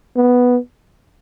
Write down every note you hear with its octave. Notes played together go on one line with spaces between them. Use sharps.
B3